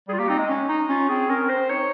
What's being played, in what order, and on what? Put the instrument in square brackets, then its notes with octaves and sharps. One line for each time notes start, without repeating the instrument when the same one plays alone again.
[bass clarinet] G3 [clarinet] G#4
[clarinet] F4
[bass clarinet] A#3 [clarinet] G4
[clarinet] C4 [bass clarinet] D#4
[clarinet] G#3
[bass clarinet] C#4
D#4
[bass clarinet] C#4 [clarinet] F4
[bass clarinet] C4 [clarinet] G#4
[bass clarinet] C#4 [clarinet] A#4
[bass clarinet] C4
[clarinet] C5
[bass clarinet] C4
[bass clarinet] D#4 [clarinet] C#5